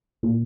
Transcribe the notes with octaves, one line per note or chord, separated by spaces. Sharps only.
A#2